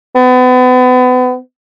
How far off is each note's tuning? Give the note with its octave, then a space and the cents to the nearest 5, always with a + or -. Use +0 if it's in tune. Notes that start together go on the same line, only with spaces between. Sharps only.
B3 +35